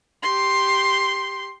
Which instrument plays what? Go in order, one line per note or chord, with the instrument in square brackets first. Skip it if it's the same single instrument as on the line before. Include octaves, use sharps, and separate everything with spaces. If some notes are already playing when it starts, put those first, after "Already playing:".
[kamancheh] G4 C6